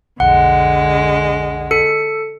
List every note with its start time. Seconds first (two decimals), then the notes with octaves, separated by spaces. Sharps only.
0.20 B1 F2 D3 G#3 F#5
1.71 A4 C#7